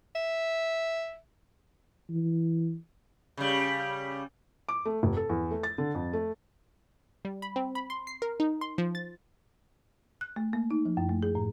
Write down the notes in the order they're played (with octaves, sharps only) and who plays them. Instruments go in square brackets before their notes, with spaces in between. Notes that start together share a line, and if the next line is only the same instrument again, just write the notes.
[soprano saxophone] E5
[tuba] E3
[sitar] C#3 G3
[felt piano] D6
A3
F1
A4
E2
A3
A6
D3
F2
A3
[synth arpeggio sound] G3
B5
C4
B5
C6
C7
A#4
D#4
C6
F3
A6
[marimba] F#6
A3
A#3
D#4
F3
F#2
A3
G#4
A2